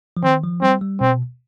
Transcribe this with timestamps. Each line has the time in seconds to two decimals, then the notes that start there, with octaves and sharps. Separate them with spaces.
0.17 F3
0.23 D#3 C4
0.44 F3
0.62 G3 C4
0.81 G3
1.01 B2 C4